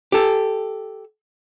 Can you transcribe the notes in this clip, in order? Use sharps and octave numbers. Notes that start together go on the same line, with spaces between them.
G4 A4